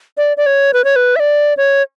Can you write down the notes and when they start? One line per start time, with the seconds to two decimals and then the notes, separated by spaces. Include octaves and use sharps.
0.17 D5
0.37 D5
0.46 C#5
0.74 B4
0.84 C#5
0.96 B4
1.16 E5
1.20 D5
1.57 C#5